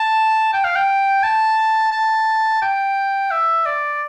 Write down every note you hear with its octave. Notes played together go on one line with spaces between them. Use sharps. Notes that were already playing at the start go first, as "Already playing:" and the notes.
Already playing: A5
G5
F5
G5
A5
A5
G5
E5
D5